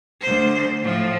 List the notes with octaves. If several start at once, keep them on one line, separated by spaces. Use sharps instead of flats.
D2 C5
A2 F3